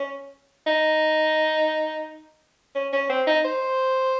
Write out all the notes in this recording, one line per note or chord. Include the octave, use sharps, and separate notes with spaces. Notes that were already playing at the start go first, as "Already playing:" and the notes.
Already playing: C#4
D#4
C#4
C#4
C4
D#4
C5